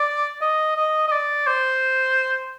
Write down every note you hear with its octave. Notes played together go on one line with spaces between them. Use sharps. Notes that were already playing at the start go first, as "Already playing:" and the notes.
Already playing: D5
D#5
D#5
D#5
D5
C5